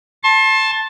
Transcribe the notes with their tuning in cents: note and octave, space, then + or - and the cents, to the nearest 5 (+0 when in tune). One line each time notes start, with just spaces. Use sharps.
A5 +0 C6 +35